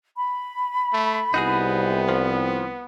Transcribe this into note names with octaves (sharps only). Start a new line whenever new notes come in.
B5
A3
C2 B3 D#4 F#4 G#4
F3